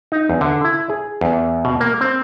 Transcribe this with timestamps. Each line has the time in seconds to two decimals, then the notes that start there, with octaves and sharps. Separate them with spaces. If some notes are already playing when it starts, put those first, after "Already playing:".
0.12 D#4
0.30 E2
0.41 D3
0.65 E4
0.90 G#4
1.21 E2
1.65 B2
1.81 A#3
2.01 C4